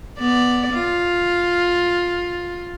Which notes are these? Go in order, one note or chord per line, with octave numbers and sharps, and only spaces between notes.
B3 D5
F4